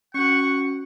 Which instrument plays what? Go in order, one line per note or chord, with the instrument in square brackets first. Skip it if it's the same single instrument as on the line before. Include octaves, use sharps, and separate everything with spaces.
[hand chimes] C#4 F#4 [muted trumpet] F#5 [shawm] C#6